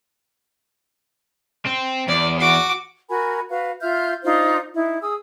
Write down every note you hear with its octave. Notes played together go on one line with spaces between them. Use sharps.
C4
E2 D5
F#4 D6
F#4 A#4 G#5 B5
F#4 B4 F5
F4 E5 F6 G6
D4 D#4 F4 C5
D#4 E4
G#4 D#6 E6